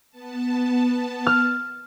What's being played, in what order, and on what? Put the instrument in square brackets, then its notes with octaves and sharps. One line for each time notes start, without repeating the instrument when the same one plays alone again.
[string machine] B3 A5
[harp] F6